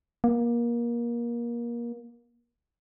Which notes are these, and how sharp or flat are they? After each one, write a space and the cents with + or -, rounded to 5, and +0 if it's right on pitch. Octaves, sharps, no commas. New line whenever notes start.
A#3 +25